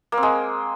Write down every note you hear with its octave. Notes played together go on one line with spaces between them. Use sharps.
A#3
C4
G#3